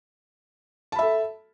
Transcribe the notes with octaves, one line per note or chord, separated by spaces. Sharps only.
A4 E5 A5 B5